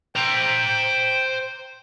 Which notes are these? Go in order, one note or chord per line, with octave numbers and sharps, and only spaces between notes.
C5 G5 A#5